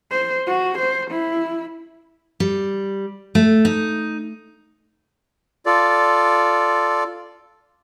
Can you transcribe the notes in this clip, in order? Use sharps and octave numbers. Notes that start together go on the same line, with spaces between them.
C5
F#4
C5
E4
G3
A3
D#4
F4 A4 D5